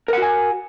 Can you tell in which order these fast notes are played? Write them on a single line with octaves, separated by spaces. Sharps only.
A#4 F#5 F#4 G#5